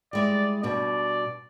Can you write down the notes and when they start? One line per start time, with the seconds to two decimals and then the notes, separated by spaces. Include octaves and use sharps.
0.13 G3 G#3 E4 D5
0.63 B2 G3 D4 D5